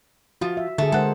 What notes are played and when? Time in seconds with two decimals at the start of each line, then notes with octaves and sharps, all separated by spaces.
0.41 F3 F4 F#4
0.57 E5
0.78 D3 A3 G#4
0.92 G#3 A4 A#4 C5 F#5